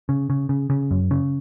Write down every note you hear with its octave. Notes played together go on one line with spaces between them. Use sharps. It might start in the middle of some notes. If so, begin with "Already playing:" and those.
C#3
C#3
C#3
C#3
F#2
C#3